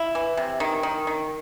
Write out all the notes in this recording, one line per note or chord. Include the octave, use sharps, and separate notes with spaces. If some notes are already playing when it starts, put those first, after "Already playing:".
Already playing: E4
E3
C3
D#3
D#3
D#3